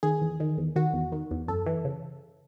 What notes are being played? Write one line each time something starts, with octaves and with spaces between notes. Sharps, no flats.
D#3 G#4
E2
D#3
E2
D#3 F#4
E2
D#3
E2
F#2 A4
E3
C#3